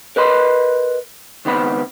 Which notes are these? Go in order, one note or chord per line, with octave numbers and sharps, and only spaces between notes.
A#4 B4 D#5 B5 C6
C#2 D#3 B3 C4 B5